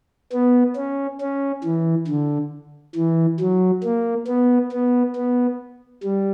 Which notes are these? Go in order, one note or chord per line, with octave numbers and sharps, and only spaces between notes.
B3
C#4
C#4
E3
D3
E3
F#3
A#3
B3
B3
B3
G3